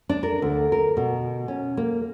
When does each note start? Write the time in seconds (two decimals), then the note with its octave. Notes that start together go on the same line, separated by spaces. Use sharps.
0.09 D4
0.23 A#4
0.42 D2
0.72 A#4
0.97 B2
1.48 C#4
1.77 A#3